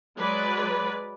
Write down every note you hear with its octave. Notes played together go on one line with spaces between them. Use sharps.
F#3 G#3 B4 D5